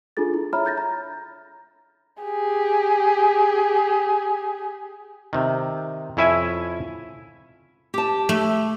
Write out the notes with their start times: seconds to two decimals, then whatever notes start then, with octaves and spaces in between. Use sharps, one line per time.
0.17 D4 F4 G#4 A4 A6
0.34 E4
0.53 C#5 E5 A#5 B5 F6
0.65 F6 G6 A6 A#6
0.78 A#5
2.23 G4 G#4
5.33 C3 D#3
6.17 F2 C#4 E4 E5 G#5
7.94 G4 A5
8.29 A3